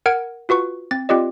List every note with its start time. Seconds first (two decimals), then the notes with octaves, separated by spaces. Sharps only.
0.06 A#4 F#5 F6 G#6 D7
0.49 F4 F#4 B4 C#6
0.91 C4 A6
1.09 C4 F4 G4 D5 D#5